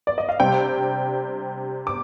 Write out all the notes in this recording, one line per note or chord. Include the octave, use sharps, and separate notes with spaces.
D5
D#5
F5
C3 G3 D4 G5
D6